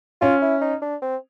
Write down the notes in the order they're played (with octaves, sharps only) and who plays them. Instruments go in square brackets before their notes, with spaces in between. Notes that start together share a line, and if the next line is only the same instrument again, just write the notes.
[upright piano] C#4 [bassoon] F4
[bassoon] E4
D#4
D4
C4